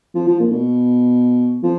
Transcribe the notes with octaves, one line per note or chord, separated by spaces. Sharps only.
F3
F3
A#2
B2
F3